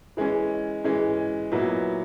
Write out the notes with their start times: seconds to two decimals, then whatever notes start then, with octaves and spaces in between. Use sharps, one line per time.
0.17 E3 G#3 C#4
0.84 E3 G#3 C#4
1.52 A#2 F#3 B3 E4